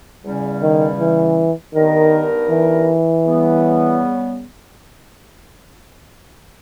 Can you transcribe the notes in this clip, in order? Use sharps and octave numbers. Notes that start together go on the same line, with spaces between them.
E2 C#3 G3 C#4
D#3
E3
G2 D#3 G3 B3 D#4 A#4
E3
C#3 G3 B3